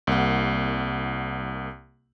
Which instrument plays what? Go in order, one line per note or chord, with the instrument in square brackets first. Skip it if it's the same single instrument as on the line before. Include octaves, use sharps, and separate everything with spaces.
[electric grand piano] C2 A#3 F#5